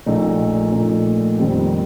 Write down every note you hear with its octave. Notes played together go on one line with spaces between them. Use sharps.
A#1 A#2 A3 D#4
A#1 A#2 A3 D#4
F2 D#3 G3 C4 G4